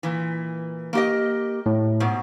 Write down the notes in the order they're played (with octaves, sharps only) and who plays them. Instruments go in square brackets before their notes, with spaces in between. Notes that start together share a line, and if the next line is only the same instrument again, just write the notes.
[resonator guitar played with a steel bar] A#2 E3
A#3 G4 D#5
[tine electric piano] A2
[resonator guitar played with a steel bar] G#2 B2